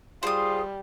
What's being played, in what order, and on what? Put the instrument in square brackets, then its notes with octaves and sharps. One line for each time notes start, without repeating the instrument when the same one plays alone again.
[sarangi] G3 [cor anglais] F4 [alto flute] G#4 [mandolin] C5 D#6